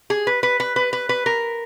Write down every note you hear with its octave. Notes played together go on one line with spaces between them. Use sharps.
G#4
B4
B4
B4
B4
B4
B4
A#4